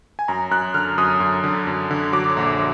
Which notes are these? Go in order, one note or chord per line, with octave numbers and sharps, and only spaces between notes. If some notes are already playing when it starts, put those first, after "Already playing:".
G#5
F#2 A#5
F#2 F#6
D3 F6
F#2 D#6
F#2
D3
F#2
D3
F#3 D6
A#1